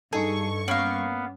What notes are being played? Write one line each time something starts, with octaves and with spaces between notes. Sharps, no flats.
G2 D#4 G#4 A4 C#6
A#3 B3 C#4 F5